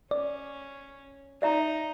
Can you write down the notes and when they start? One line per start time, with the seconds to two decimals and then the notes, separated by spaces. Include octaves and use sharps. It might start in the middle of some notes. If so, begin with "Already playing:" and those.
0.11 C#4 D5
1.42 D#4 D5 E5 A#5